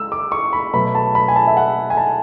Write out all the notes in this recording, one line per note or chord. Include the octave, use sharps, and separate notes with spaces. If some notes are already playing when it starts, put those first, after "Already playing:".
Already playing: G#3 E6
D6
C#6
B5
B2 F#3 A3 B5
A5
B5
G#5
A5
E5
F#5
G#5
A5